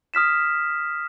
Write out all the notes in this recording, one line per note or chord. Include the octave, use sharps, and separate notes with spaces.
D#6 F6 B6 E7